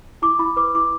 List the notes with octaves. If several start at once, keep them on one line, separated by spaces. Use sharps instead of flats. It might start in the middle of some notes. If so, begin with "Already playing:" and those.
E4 D6
E4 B5
B4 D6
E4 D6